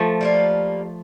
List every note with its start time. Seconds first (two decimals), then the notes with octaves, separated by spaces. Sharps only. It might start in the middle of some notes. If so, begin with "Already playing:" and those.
Already playing: F3 A3
0.21 G3 A#3 F4